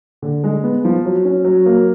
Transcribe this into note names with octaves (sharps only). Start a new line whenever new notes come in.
D3
G#3
B3
F3
F#3
C#4
F#3
A#3